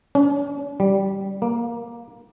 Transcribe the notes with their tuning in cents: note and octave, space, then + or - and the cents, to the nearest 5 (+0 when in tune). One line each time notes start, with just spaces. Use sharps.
C#4 +40
G3 -10
A#3 +15